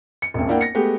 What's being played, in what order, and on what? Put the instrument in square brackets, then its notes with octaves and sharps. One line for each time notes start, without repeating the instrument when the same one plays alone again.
[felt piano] C#7
E1 A1 F2
A#3 D4 E4 A#4 F#5 G5
A#6 C#7
G#3 A3 B3 G4